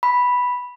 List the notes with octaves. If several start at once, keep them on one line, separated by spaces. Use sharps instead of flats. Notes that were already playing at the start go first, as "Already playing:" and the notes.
B5